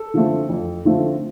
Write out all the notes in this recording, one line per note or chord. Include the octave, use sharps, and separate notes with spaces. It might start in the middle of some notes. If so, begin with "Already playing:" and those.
Already playing: A4
D3 F3 A3 C4
F2
D3 F3 A3 C4